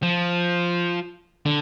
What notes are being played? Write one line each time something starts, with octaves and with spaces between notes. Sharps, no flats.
F3
D3